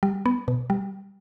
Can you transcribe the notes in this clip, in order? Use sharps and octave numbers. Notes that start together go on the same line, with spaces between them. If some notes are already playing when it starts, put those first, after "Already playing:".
G3
B3
B2
G3